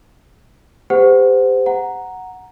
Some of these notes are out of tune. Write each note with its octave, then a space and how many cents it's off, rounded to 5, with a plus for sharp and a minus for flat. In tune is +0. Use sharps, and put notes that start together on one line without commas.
G4 +30 C5 -30 F#5 +0
F#5 +0 A#5 +0